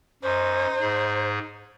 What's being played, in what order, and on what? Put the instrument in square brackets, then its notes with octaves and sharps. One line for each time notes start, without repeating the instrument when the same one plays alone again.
[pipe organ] F#2 [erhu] D#4 [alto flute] C5
[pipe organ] G#2 G#4